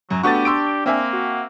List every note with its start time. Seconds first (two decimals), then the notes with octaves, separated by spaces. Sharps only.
0.11 F#2 F#3
0.23 A3 B3 D4 F#4 G4 C#6 A6
0.45 C6 E6 D7
0.86 A#3 C4 E5 G#5
1.13 F#4